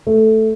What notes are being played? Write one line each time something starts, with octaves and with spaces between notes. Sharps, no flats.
A3